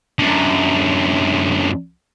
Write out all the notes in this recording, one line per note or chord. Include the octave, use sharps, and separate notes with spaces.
F#2 D3